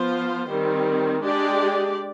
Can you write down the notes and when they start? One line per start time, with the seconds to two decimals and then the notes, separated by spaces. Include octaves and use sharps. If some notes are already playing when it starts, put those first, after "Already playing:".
Already playing: F3 B3 F4 C5
0.50 D#3 G3 C4
1.21 G#3 D4 G4 D5